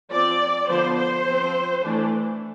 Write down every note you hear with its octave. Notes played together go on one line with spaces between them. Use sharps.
F3 C4 D5
D3 F3 B3 C5
C5
F3 C4
E3 A3 D4